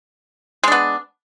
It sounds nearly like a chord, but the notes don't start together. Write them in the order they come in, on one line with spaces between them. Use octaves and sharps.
G#3 D4 B3